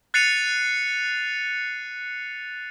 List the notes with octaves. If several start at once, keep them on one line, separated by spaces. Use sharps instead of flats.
F#6 A6 C7 C#7 D#7 F7